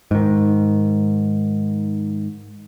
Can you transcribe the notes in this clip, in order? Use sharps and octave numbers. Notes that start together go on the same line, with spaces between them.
G#2 D#3